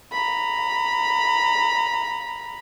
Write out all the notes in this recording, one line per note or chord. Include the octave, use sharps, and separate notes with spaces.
A#5 B5